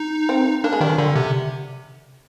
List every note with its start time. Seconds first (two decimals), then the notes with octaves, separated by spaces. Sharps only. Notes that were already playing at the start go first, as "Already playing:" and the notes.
Already playing: D#4
0.29 C4
0.64 A#3 D4
0.73 G#3
0.81 D#3 G3
0.90 F3
0.98 D3 G3
1.16 C3